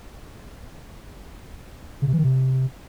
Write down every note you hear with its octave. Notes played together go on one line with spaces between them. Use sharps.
C#3
C3
E3
D#3
C3